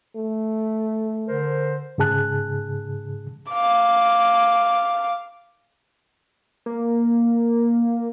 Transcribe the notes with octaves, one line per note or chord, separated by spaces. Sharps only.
A3
D3 A#4 C5
G#2 C#3 G#4 A5 F#6
F5 D6
A#3